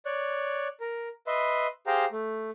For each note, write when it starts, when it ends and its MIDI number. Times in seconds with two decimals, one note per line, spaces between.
0.06 0.68 73
0.06 0.68 74
0.06 0.68 90
0.81 1.09 70
1.27 1.67 71
1.27 1.67 75
1.27 1.67 76
1.27 1.67 83
1.27 1.67 84
1.87 2.05 67
1.87 2.05 68
1.87 2.05 72
1.87 2.05 77
1.87 2.05 79
1.87 2.05 82
2.12 2.50 57